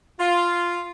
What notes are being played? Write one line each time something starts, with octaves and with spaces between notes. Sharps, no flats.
F4